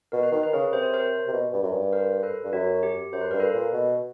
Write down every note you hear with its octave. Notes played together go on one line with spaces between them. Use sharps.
B2 A#4
B4
D#3 A#4
B4
C#3 G#4 A#4
C3 C5
C#5
A#4 C5
C3
B2
G2
F#2
G2
A#4 C5
A4 B4
G2
F#2 F#4
G4
F#2 C5
B4
G2 A#4
A4 B4
A#2
B2